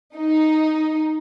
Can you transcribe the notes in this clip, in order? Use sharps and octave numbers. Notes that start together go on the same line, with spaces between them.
D#4